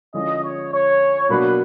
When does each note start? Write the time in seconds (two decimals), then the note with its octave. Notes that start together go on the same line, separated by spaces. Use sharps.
0.14 D3 F3 G#3 C#4 F4 D#5
0.43 C#5
0.72 C#5
1.29 B2 F#3 A#3 D4 F#4 B4